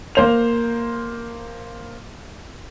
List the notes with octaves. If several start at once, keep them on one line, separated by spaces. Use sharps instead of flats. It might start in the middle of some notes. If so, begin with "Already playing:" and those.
A#3 C5 F7